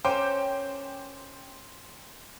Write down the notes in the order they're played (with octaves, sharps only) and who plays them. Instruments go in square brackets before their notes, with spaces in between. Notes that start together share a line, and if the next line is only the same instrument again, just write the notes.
[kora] C#4 A#4 [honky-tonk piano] C5 G5 D6